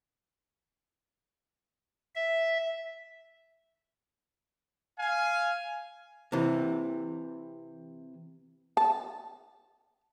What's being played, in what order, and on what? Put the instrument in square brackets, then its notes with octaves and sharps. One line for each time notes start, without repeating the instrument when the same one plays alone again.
[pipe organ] E5
[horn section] F5 G#5
[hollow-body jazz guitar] C3 E3
[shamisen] A5